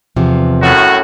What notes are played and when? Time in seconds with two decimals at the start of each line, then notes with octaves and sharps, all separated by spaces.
0.16 E2 C3 F3
0.61 F#2 A2 F#4